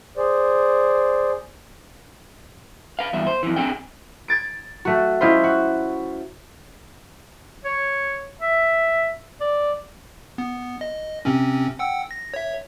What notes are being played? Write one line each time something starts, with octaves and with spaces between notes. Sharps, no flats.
G#4 C5 D5
B4 F5
E2 G2 E5
C5
F2 E3
C4 D4 G#4 G5
G#6 A6 D7
A3 F#4
G#3 C#4 E4 F4 C5
F#4
C#5
E5
D5
B3
D#5
C3 C4 C#4
F#5 G5 E6
A#6
C#5 E5